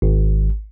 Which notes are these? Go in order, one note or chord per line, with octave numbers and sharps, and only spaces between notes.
G#1